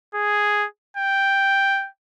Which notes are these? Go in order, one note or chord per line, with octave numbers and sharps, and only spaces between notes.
G#4
G5